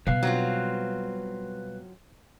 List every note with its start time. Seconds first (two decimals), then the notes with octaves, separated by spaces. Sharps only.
0.07 B2 G3 B4 F5
0.23 F#3 C4 F4